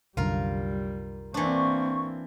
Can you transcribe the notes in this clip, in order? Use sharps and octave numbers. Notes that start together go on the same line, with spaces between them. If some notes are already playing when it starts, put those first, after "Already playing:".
C2 F#2 D3 G3 F4 A#4
E3 A#3 C4 D4 C#6